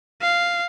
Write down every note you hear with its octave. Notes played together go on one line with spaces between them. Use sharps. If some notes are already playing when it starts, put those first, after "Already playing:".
F5